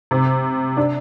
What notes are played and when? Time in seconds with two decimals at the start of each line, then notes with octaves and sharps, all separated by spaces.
0.11 C3
0.77 D4